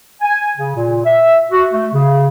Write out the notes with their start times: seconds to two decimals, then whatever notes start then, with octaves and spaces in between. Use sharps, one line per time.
0.22 G#5
0.58 C#3
0.75 A#2
1.05 E5
1.52 F#4
1.73 A3
1.94 C#3